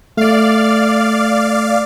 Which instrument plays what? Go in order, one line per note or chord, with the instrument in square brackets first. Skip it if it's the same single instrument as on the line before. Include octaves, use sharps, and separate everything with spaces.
[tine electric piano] A3 [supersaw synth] D5 F5